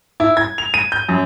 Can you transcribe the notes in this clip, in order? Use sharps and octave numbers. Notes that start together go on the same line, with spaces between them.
E4
G#6
F7
D#7
G6
F#2